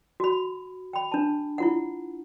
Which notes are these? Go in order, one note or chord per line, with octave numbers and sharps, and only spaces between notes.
F#4 B5
G5 B5
D4 A5
E4 F4 F#5